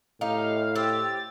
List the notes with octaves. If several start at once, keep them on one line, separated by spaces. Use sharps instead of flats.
A2 D#4 G4 F5
G4 C5 E6 A6